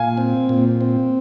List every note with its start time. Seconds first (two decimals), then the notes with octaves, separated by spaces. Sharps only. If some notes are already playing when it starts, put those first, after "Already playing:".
Already playing: A#2 F5 G#5
0.17 C4
0.49 A#2
0.81 C4